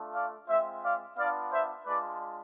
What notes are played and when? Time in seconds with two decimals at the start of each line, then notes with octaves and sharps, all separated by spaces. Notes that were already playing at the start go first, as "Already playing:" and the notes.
Already playing: A3 D4 F4
0.14 D5 F5
0.48 G#3 C4 F4 C5 E5
0.82 D5 F5
1.17 B3 D4 F4 D5 F5
1.52 C5 E5
1.86 G#3 D4 F4 B4 D5